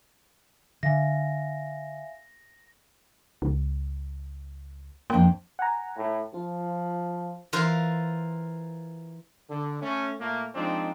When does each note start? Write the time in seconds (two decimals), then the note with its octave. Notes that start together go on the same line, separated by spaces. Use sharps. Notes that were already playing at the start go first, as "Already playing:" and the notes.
0.83 D3 E5 F5 G#5 A#6
3.42 C#2
5.10 F2 A#3 D4 G5
5.59 F#5 G#5 A#5
5.97 A2
6.34 F3 F4
7.53 E3 F4 A#4 C5
9.49 D3
9.81 A3 C#4
10.19 A#2 A3 A#3
10.55 F3 G#3 C4 D4 D#4